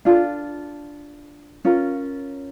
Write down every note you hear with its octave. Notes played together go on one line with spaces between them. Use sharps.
D4 F4 A4
C#4 F4 A#4